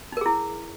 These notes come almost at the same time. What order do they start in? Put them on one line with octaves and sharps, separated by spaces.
D#4 A#4 G#4 E4